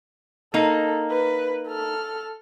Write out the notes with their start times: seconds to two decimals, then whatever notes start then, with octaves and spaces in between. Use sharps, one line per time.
0.54 A#3 D#4 A4
1.11 B4
1.68 A4 F6